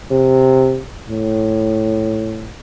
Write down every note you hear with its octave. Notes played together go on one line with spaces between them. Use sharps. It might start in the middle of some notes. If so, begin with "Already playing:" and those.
C3
A2